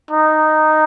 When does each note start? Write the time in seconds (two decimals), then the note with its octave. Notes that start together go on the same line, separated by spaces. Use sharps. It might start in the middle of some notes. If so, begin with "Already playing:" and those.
0.11 D#4